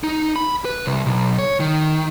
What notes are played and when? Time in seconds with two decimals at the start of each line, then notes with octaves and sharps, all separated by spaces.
0.04 D#4
0.36 B5
0.65 B4
0.86 C2
1.06 B1
1.39 C#5
1.60 D#3